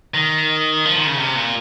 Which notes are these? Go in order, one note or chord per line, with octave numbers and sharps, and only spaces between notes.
D#3
F3
D#3
C#3
C3
A#2